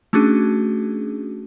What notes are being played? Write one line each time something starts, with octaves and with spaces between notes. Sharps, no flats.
A3 C#4 D4 F#4 G#4